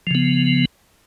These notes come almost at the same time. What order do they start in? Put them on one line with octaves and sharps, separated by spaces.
F3 C#3 B3